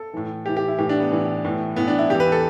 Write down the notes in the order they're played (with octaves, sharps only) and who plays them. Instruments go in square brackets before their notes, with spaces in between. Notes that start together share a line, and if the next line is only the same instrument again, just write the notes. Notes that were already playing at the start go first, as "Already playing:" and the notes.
Already playing: [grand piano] A4
A2 E3
A2 E3 G4
G4
E4
A2 E3 G4
D4
B3
A2 E3
A2 E3
A2 E3 B3
D4
E4
E2 E3 G4
B4
A4